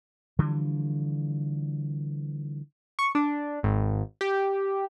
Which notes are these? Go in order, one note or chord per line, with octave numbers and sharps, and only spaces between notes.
D3 E3 F3 G3
C#6
D4
G#1
G4